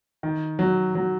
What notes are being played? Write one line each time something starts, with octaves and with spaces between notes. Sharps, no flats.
D#3
F#3
F#3